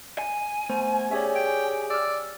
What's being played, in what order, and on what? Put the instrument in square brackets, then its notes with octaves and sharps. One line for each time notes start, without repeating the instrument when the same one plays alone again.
[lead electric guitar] G#5
[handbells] A3 B3 C5
[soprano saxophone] C#4 [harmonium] G4 G#4 [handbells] C#5 D5 E5
[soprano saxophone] G5
[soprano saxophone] D5 [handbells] E6 F6